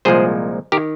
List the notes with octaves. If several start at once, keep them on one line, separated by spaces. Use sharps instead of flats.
C2 A#2 F3 G#3 G#4 C5
D#3 G4 A#4